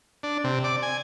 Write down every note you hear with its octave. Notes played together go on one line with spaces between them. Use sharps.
D4
C3
D5
G#5